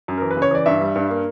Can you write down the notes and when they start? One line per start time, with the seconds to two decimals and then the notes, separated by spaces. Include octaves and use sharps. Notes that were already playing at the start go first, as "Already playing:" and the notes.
0.08 F#2
0.18 E3 A#4
0.31 B4
0.36 C#3
0.42 C#5
0.51 E3 D5
0.66 G2 E5
0.81 G3
0.95 G2
1.10 A#3